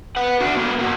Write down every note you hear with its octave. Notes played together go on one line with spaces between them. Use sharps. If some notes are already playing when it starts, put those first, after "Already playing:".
B4 F#5
D4 F#4
A#3 B3
A#3 F#4